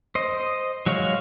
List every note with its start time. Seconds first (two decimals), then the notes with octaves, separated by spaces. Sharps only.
0.15 C5 D#5
0.86 F#3 G#3 F#4 C#5 F5